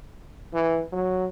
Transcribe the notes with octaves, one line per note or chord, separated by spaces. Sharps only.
E3
F#3